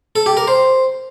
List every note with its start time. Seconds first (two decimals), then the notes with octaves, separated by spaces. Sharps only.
0.16 A4
0.26 G4
0.37 A#4
0.48 C5